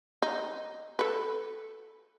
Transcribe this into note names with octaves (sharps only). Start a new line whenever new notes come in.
D#4
A4 B4